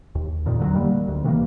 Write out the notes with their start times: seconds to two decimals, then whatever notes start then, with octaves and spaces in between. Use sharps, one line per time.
0.15 D#2
0.46 F2 A#2 D#3
0.60 D3 F3 F#3
0.74 D#3 G3 A#3
1.08 D2
1.24 C3 D#3 E3 A#3